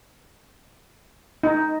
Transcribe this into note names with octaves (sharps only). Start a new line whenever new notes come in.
D#4